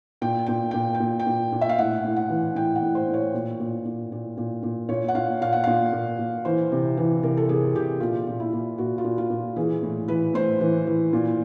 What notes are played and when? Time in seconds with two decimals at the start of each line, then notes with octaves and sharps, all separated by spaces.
0.22 A#2 G5
0.46 A#2 G5
0.71 A#2 G5
0.94 G5
1.00 A#2
1.20 G5
1.26 A#2
1.52 A#2
1.61 E5
1.69 F5
1.78 A2 F#5
2.04 A2
2.16 F#5
2.29 E3
2.55 A2 G5
2.75 F#5
2.82 A2
2.95 C5
3.08 A2
3.14 C#5
3.34 A#2
3.60 A#2
3.85 A#2
4.12 A#2
4.37 A#2
4.63 A#2
4.89 A#2 C#5
5.08 F#5
5.15 A#2 F5
5.41 A#2 F5
5.53 F#5
5.64 A#2 F5
5.93 A#2
6.19 A#2
6.45 E3 C5
6.72 C3
6.97 E3
7.23 C3 A#4
7.37 A4
7.49 C3 G#4
7.74 C3 G4
8.00 A#2 F4
8.27 A#2
8.40 E4
8.53 A#2
8.78 A#2 F#4
8.98 F4
9.04 A#2
9.18 F4
9.30 A#2
9.56 E3 G#4
9.83 A2
10.08 E3 B4
10.34 A2 C5
10.61 E3
10.87 E3
11.13 A#2